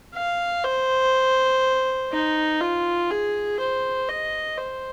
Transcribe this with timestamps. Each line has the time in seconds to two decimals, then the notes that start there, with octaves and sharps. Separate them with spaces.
0.15 F5
0.64 C5
2.12 D#4
2.61 F4
3.10 G#4
3.59 C5
4.09 D#5
4.57 C5